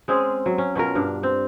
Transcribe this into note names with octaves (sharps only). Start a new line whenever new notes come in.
G#3 C4 C#4 G#4
F#3
C#4
B2 C#4 F4 A#4
G2 D4
C4